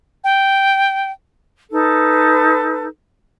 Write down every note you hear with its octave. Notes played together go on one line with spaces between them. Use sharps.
G5
D#4 A4 B4